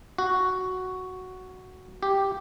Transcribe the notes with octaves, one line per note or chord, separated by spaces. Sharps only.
F#4
G4